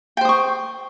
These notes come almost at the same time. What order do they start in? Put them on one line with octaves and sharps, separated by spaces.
G5 C5 D#6 C#6